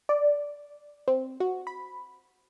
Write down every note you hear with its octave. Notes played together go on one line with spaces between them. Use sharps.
D5
C4
F#4
B5